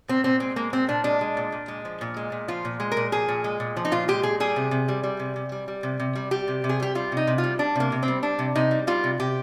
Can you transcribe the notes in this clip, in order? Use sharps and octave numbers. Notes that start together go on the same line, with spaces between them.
A#2 C4
A#2 C4
G#3 C4
G#3 A#3
A#2 C4
A#2 D4
G#3 D4
G#3
A#2
A#2
G#3
F3
A#2
G#3
A#2
F3 F4
A#2
G#3
A#4
A#2
F3 G#4
A#2
G#3
A#2
F3
D#4
A#2 F4
G#3 G4
A#2 G#4
G3 G#4
C3
C3
G3
G3
C3
C3
G3
G3
C3
C3
G3
G3 G4
C3
C3
G#4
G3 G4
G3 F4
C3 D#4
C3
F4
G3
G3 D4
C3 A#3
C3
C4
G3
G3 D4
C3
C3 D#4
G3
G3 F4
C3
C3 G4